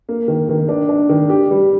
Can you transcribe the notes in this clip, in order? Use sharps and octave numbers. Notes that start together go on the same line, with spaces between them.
A#3
D#3
D#3
D4
D4
D#3
G4
G3